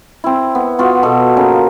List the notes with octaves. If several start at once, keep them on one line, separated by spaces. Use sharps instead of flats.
C4 E4
B3
B3 F4 F#4
B2 A4
C#3 A#3